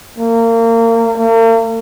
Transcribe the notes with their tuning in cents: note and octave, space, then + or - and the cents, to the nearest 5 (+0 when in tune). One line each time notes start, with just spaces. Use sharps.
A#3 -30
A#3 -45